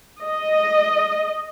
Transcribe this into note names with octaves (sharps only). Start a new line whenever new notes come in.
D#5